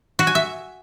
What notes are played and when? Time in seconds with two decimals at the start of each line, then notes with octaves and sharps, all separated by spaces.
0.19 F#4
0.27 G#5
0.35 E5